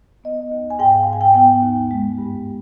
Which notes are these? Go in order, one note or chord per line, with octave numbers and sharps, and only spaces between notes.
B3 D#5
D#2
G#5
G#2 G5
F5
G#2
G#5
G5
B3 G5
D#2
G#3
G2